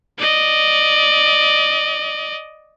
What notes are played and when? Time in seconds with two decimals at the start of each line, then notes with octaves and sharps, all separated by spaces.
0.18 D5 D#5